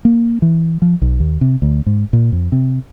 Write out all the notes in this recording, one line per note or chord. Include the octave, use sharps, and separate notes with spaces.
A#3
E3
F3
B1
D#2
C3
D2
G#2
A#2
F2
C3